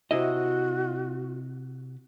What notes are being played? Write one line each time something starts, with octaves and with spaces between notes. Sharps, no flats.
C3 E4 F#4 D#5